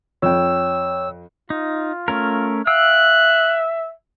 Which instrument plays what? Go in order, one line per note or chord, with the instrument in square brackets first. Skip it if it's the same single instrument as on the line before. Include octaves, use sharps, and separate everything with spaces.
[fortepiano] F2 [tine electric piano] C#5 G5 [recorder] E6
[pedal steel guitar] D#4 [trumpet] F4
[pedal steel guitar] A3 C#4 A#4
[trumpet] E5 [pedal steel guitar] F5 G5 E6 [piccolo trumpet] F#6